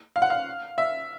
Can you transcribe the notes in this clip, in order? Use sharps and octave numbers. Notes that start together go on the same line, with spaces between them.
F5
F#5
F5
E5